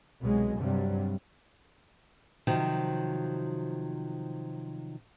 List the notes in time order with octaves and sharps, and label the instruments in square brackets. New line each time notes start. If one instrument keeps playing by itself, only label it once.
[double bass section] C2 B2 F#3 G#3
G2 C3 F#3 G3
[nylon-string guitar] C3 D#3 F3 F#3